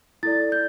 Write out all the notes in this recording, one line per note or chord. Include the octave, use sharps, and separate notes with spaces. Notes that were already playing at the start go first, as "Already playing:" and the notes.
E4 A4 D5 A6
G6